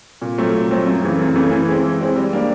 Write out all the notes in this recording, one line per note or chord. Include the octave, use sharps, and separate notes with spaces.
A#2
F#3 A3 C4
A#2
F#3 A3 C4
F#2
C#3 E3 A3
F#2
C#3 E3 A3
E3
G#3 C4
E3
G#3 C4
G3
A#3 D4